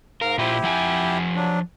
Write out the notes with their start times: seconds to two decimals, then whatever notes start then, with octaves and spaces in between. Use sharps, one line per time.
0.21 G#2 A#4 F5
0.38 A#2 E4 F4 G4 C5
0.63 F3 F#5 G#5
1.36 F#3 D4